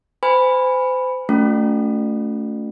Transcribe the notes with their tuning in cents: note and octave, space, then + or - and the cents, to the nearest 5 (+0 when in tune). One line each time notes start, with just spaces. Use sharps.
C5 -35 G#5 -15 B5 +0
A3 +0 C#4 +30 F4 +35